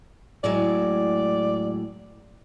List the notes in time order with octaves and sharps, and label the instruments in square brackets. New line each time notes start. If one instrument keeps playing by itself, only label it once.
[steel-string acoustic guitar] A2 F#3 G#3 [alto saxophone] D5